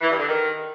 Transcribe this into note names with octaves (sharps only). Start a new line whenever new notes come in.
E3
G2
D3
D#3